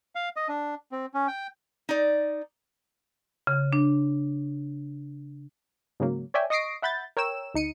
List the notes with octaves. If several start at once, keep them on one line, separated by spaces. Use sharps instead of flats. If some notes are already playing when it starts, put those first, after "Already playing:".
F5
D#5
D4
C4
C#4
G5
D#4 D5
C#3
D4
G#2 C#3 F#3 A#3
C#5 D5 E5 G5 G#5
D#5 C#6 D#6 A#6 C7 D7
E5 F#5 B5 G6 A6
A#4 C#5 G5 E6 E7
D2 D#4 C#7 D#7